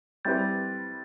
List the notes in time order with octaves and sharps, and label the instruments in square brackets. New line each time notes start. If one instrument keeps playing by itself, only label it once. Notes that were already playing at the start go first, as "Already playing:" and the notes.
[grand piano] G3 C4 E4 G4 B4 [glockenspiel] G6 A6